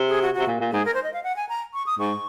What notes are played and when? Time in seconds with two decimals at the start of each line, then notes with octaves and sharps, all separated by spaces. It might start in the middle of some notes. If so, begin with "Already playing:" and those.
Already playing: C3
0.08 G#4
0.22 F#4
0.34 C3 F#4
0.47 A#2
0.60 A#2
0.72 G#2 G#4
0.85 A#4
0.94 C5
1.04 D#5
1.14 F5
1.24 F#5
1.36 G#5
1.49 A#5
1.74 C#6
1.86 D#6
1.99 G#2 C#6